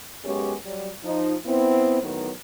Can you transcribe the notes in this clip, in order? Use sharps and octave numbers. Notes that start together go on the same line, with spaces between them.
F#2 G#3 B3 C#4 G4 C#5
F#3 G3
F3 D#4
B3 C4 E4
A2 D#3 F#3 B3